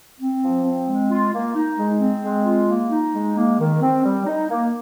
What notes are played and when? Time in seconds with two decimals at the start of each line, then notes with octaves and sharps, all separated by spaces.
0.20 C4
0.42 F3
0.66 C4
0.88 G#3
1.11 F4
1.33 A#3
1.55 D#4
1.78 G#3
2.00 C4
2.23 G#3
2.45 F4
2.69 A#3
2.90 D#4
3.13 G#3
3.37 A#3
3.59 D#3
3.81 C4
4.04 G3
4.26 D#4
4.49 A#3